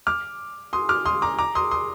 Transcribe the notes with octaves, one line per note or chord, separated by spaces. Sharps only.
D6 F6
C6 D#6
D6 F6
C6 D#6
A#5 D6
A#5 D6
C6 D#6
C6 D#6